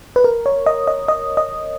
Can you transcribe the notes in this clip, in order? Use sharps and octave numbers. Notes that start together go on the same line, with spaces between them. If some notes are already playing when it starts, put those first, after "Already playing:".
B4
A#4
C#5
D#5
D#5
D#5
D#5